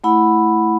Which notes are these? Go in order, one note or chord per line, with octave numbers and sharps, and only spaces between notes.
A3 E4 F#5 B5